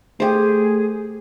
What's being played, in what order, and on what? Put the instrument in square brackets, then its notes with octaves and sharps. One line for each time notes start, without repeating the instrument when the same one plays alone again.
[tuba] A3 [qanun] G4 C5 [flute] G#4